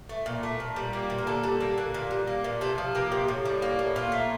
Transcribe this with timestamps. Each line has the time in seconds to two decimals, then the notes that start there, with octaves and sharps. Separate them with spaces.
0.09 A3
0.26 A#2
0.43 A3
0.60 A#2
0.76 G3
0.93 A#3
1.10 A#2
1.18 A#4
1.27 D3 A4
1.43 G3
1.60 A#3
1.78 D3
1.94 A#2
2.11 G3
2.27 A#3
2.44 A#2
2.61 C3 A4
2.78 F3
2.95 A#3 G4
3.12 C3
3.28 A2
3.45 G3
3.62 A#3
3.79 A2
3.96 A#2 F4
4.12 A3